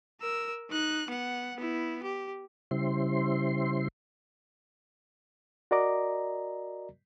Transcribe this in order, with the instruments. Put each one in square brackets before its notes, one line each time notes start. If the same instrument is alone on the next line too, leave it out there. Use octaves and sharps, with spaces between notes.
[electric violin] A#4 E6
D#4 F#6
B3 F#5
B3 E4
G4
[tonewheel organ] C#3 G3 E4 C5 C6
[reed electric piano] F#4 A#4 D5 D#5 A#5 D6